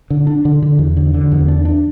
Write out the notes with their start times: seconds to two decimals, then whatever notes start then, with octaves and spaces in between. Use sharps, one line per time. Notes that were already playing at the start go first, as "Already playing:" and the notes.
0.10 D3
0.27 D4
0.45 D3
0.62 D3
0.79 E2
0.97 D3
1.14 D3
1.32 E2
1.48 D4
1.65 D4